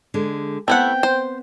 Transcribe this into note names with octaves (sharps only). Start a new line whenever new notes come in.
D3 G#3 G#4
A3 B3 C4 E4 F#5 G5
C5